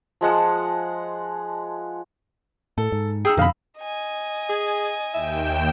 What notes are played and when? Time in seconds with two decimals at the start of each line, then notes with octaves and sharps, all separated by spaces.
0.21 F3 G#3 F#5 A5
2.78 A2 A4
2.92 G#2
3.25 D#4 G#4 G5 E6
3.37 F2 B2 D3 D#4 F5 B5
3.79 D#5 G#5
4.50 G#4
5.14 D#2 E5 G5 E7